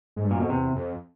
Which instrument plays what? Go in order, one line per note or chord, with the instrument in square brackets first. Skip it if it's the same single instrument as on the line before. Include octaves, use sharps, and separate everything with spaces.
[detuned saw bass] G#2
G2
[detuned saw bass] F#2 [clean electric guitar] A#2
[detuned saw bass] F2 [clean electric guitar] B2
[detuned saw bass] E2 [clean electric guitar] C3
[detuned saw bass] F2